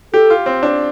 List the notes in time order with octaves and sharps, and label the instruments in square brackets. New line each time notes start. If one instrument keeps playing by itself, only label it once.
[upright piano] G4 [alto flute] A4
[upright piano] F4
C4
D4